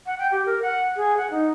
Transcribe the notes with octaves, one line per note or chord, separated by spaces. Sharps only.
F#5
G5
G4
A#4
F#5
G#4
F#5
D#4